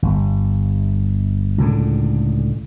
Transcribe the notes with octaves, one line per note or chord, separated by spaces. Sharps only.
G1
C#2 A2 D3